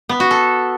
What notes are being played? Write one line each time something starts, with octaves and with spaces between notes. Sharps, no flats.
B3
F#4
A4